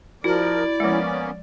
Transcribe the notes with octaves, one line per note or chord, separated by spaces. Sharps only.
F3 E4 F#4 A#4 D5
F3 G#3 A#3 B3 C#4